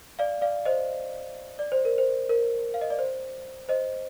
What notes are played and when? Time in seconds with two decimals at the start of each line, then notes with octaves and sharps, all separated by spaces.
0.19 D5 F5
0.42 D5 F5
0.65 C5 D#5
1.59 D5
1.72 C5
1.85 A#4
1.98 C5
2.29 A#4
2.74 F5
2.81 D#5
2.90 D5
2.99 C5
3.69 C5 D#5